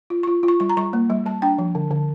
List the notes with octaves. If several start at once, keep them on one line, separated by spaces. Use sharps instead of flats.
F4
C#6
F4
F4
C#6
G3 C#6
A#5
G3 C#6
A#3
G3
G3 A5
D4 G5
F3
D3
D3